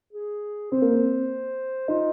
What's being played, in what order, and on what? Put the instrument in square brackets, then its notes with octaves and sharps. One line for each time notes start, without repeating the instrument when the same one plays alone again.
[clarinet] G#4
[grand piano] C4 [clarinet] C5
[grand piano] A#3
C4
[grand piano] D#4 [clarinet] F4